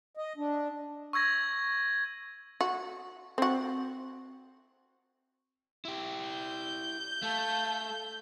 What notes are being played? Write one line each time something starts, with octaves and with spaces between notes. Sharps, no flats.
D#5
D4
C#6 E6 G#6 A#6
F#4
C4 F#4
E4 G4
G6
A3 F5 A5